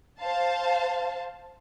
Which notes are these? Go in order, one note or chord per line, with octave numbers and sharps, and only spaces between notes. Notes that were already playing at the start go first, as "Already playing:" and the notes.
C5 F5 A5